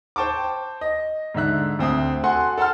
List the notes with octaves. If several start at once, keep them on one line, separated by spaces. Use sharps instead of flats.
C5 G5 A5 C#6 D6
D#5
G#2 D3 E5 F#6
D2 C4 E5 D#6
F#4 A4 F#5 G#5 C6
A4 F#5 A5 C6 F6